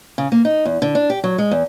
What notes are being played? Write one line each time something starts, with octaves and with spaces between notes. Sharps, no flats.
C#3
A#3
D#4
E2
D3
D4
G4
F#3
G#3
E2